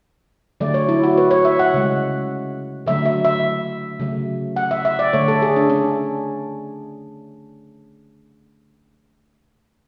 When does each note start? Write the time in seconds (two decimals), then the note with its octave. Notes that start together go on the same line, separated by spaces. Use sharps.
0.60 D3 F#3 A3 D5
0.74 C#5
0.89 E4
1.03 F#4
1.18 B4
1.31 C#5
1.45 E5
1.59 F#5
1.74 C#3 G#3
2.86 D3 F#3 A3 E5
3.06 E5
3.25 E5
4.00 C#3 F#3 A3
4.56 F#5
4.71 E5
4.85 E5
4.99 D5
5.13 D3 A3 C#5
5.28 A4
5.42 G#4
5.56 D4
5.70 C#4